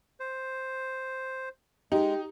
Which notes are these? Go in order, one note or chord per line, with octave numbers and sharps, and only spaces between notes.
C5
G#3 D#4 G4